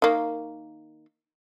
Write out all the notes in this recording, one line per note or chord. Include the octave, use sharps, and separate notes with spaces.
D#3 A#3